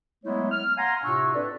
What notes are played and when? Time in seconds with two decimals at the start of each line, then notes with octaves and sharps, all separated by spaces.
0.25 F#3 G#3 A3 B3 E4 C#5
0.52 F6
0.78 F5 F#5 G#5 A#5 C6
1.04 A2 C3 D4 F4 C#6 E6
1.35 C4 D4 A4 B4 D5